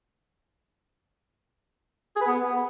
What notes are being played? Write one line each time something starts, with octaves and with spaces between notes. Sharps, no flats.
G#4
B4
B3